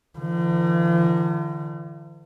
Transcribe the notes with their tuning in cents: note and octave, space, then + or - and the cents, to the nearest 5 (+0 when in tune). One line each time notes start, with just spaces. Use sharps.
D3 +40 F3 -45